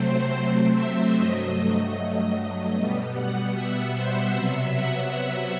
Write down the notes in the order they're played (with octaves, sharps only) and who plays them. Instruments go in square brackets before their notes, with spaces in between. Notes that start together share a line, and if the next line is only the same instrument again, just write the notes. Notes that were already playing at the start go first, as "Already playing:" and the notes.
Already playing: [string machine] C3 F#3 A3 C4 C5
E5
G2 F#3 A3 D#5
D#5
B2 G3 B3
F#5
E5
C5
C3 F#3 B3 E5
F#5
E5